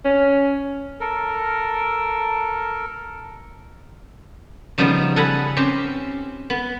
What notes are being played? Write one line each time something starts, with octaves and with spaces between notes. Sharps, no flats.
C#4
A4 A#4
C#3 F3 G3 B3 D#4
A4 F#5 G#5 A#5 B5
C4 C#4 G4
B3